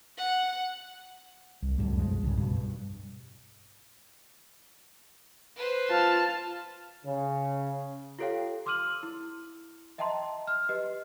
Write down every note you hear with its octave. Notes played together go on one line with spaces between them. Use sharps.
F#5
C2
C#2 F#2 A2 G3
B1 F3 G#3
C2 G2 C#3
G2 B2
G2
B4 C5
F4 A5 F6
C#3
F4 G4 A4 C#5 F5 G5
C6 D6 E6 F6 D#7 F#7
E4
D#5 E5 G5 A5 A#5 C6
F6
G4 B4 D#5